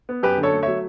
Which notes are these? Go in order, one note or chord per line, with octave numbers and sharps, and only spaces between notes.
B3
F#2 G4 B4
D3
A4 C#5
A3
F#3 C#5 E5